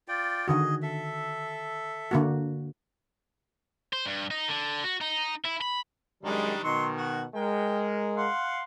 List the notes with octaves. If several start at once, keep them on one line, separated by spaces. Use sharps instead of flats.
F4 D5 G5
D3 D#3 F#4 G#4 D#5
A4 E5
D3 A#3 F#4
C5
G2
D#4
D3
F#4
D#4
E4
B5
F#2 D#3 G3 G#3 D4
B2 D#3 F#3 D#4 C6 C#6
F#4
G#3 A#4 G5
F5 F#5 C6